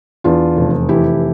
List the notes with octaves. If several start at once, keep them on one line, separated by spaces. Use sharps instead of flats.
E2 D4 F4
F1
E3 E4 G4